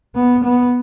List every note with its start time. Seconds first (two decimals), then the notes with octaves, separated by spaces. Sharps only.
0.15 B3
0.44 B3